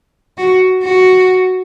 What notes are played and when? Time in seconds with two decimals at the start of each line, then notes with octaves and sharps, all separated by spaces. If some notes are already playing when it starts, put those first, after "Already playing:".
0.38 F#4
0.83 F#4